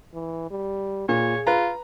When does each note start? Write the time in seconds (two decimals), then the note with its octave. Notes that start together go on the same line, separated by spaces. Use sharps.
0.14 E3
0.50 G3
1.09 A#2 G#4 C#5
1.47 F4 B4 A#5